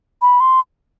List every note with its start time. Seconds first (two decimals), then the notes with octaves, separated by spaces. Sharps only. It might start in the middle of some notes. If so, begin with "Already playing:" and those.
0.22 B5
0.40 C6